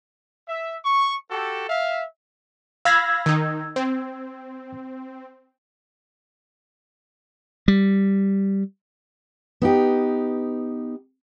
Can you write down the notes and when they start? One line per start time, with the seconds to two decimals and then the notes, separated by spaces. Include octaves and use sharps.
0.48 E5
0.85 C#6
1.31 F#4 G4 A4
1.69 E5 F5
2.85 F5 B5 E6 G#6 A#6
3.26 D#3 D#4
3.76 C4
7.68 G3
9.62 B3 D#4 G4